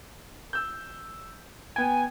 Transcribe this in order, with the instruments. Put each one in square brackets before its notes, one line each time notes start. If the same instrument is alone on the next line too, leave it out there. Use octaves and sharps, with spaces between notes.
[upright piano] E6 G6
[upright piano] B3 G5 [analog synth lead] G#5